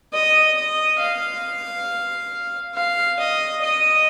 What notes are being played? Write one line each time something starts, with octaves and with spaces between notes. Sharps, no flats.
D#5
D#5
F5
F5
D#5
D#5